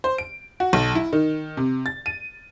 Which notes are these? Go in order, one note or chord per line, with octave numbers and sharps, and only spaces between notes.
C5
D7
F#4
B1
E4
D#3
C3
A6
D#7